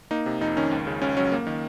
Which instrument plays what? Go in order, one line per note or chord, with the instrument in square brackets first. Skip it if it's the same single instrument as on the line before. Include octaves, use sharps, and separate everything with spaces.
[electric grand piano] A#3 D#4
C3
F2 D#4
D#3 C#4
C#2
C#3
C#2 C#4
F#3 C#4
A#3
D#3